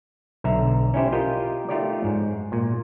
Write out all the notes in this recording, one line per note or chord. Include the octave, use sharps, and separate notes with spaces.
B1 D3 E5 A#5
C#4 D#4 E4 G4 C5
F4 G4 A#4 D#5 G5
A3 D#4 F4 G4 C#5 D5
G#2
A#2